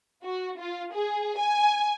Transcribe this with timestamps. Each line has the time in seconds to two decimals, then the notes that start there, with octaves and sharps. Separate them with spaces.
0.24 F#4
0.59 F4
0.93 G#4
1.38 G#5